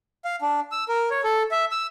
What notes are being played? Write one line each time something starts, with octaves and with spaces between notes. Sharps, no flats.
F5
D4
E6
A#4
C#5
A4
E5
E6